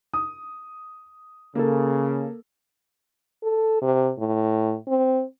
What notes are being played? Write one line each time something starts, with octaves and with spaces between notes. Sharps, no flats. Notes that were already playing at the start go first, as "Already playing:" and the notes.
D#6
C#3 A#3 A4
A4
C3
A2
C4